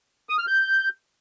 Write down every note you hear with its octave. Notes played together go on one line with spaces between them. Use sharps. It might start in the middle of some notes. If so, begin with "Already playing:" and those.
D#6
F6
G6